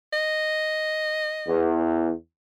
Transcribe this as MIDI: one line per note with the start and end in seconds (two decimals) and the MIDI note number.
0.13 1.73 75
1.47 2.12 40